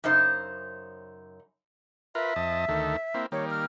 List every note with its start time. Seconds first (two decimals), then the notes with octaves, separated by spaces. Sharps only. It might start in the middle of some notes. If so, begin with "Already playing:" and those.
0.04 F#2 C#3 D#4 C5
2.15 F4 A#4 B4 E5
2.36 F2 D#5 A5
2.68 D2 D#3 A4
3.14 A#3 C4 E4
3.32 D#3 G3 A#3 C#5
3.50 F6